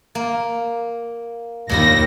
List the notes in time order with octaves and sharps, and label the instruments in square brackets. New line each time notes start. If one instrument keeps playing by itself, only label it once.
[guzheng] A#3
[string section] D#2 A#6 [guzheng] A#2 D#3 B5